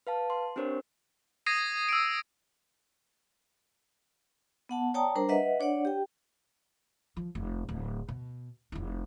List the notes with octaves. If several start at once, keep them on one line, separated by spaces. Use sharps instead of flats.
B4 F5 A5
C6
C4 D4 G4 A#4 C5 C#5
D#6 G#6 A#6 C7 D#7
E6 D7
B3 F#5 A5
C#5 D5 G5 A5 A#5 D#6
G3 D4 A#4 C5 A#5
B4 D#5 E5 F#5
D4 C#5 D5 F#5
G4 G5
F3
F1
D1
B2
F1 E4